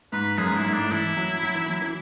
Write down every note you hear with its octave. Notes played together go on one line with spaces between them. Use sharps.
G#2 B4
F#2 G#4
G#2
E4
G#2
A2 D4
E3 E4
F#3
F#3
E3
F#3
E3